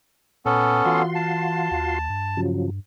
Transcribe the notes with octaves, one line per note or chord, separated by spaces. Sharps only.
A#2 B3 C#4 A4
E3 F4 F#4 C6
A5
D#2
G2
C#3 F3 F#3